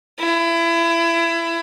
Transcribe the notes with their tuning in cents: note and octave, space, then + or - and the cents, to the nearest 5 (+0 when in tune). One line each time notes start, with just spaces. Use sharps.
E4 +25